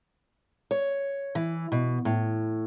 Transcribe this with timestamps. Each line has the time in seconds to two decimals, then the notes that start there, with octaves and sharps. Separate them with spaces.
0.71 C#5
1.35 E3
1.72 B2
2.05 A2